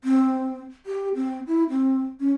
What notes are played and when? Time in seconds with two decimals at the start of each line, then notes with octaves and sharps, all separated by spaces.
0.04 C4
0.86 G4
1.15 C4
1.47 E4
1.70 C4
2.20 C#4